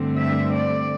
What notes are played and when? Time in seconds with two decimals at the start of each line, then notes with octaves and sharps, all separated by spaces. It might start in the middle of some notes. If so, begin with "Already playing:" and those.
Already playing: G2 D3 A3 C4
0.16 E5
0.54 D5